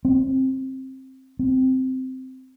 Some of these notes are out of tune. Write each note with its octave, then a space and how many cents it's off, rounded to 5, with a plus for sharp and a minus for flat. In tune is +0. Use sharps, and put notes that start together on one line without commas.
C4 +15
C4 -10